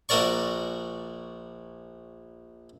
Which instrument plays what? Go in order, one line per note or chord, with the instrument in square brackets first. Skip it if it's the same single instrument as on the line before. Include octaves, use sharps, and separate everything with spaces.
[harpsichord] A#1 F#4 A#4 D5 C#6